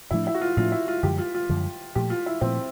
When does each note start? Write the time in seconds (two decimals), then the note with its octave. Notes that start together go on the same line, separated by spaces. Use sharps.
0.11 A2 F3 A3 D4 E4
0.27 E4
0.34 F#4
0.41 F4
0.57 A2 F3 A3 D4 F4
0.72 E4
0.88 F4
1.03 F#2 D3 F3 G#3 G4
1.18 F4
1.35 F4
1.49 F#2 D3 F3 G#3
1.95 A#2 F3 A3 G4
2.10 F4
2.26 E4
2.41 A#2 F3 A3 C4